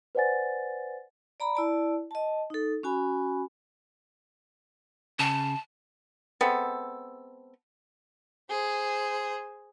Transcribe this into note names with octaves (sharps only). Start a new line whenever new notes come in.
B4 C5 D5 F#5 G#5 A6
D5 A#5 B5
E4 D5 A5
D#5 A5
D#4 A4
C#4 F#4 G#5 B5
C#3 A5
G#3 B3 C4 A4
G#4 C5